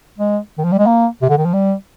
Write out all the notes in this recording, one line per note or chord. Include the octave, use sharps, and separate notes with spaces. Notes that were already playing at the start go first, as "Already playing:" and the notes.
G#3
D#3
F3
G3
G#3
A#3
C3
D3
D#3
F3
G3